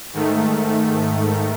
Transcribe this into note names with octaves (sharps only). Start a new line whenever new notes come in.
G#2 D#3 A3